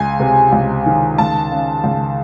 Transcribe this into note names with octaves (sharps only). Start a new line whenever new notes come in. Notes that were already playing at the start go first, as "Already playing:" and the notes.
Already playing: C#2 G#5
C3
C#2
D#3
C#2 A5
C#3
C#2